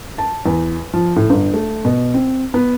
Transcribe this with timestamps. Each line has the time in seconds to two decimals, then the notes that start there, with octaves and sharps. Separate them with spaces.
0.18 A5
0.46 E2
0.93 F3
1.16 A2
1.30 G1
1.54 A3
1.85 B2
2.14 C4
2.54 B3